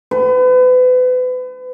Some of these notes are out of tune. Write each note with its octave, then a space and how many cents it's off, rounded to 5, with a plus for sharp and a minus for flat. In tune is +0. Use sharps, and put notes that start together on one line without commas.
B4 +35